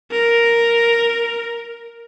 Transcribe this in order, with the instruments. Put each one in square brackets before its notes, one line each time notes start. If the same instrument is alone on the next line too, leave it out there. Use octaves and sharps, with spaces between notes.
[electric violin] A#4